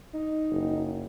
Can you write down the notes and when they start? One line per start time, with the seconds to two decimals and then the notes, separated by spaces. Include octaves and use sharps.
0.13 D#4
0.51 F#1